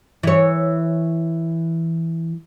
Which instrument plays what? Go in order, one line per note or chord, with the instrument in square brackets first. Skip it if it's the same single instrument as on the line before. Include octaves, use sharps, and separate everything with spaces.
[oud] E3 C#5